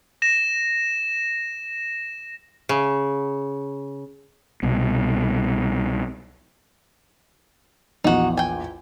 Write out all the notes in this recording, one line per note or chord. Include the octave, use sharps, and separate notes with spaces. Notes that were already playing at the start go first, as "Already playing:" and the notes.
A#6 E7
C#3
C2 B2
A#1 E2 D#4 F#4
G5 G#5